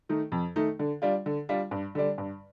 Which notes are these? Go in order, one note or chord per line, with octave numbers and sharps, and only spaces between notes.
D#3 A3 D#4
F2
D#3 A3 D#4
D3
G3 D4 F4
D3
G3 D4 F4
G2
D3 G3 D4
G2